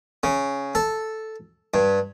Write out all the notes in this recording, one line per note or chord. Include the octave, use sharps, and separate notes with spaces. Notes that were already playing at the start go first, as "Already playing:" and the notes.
C#3
A4
G2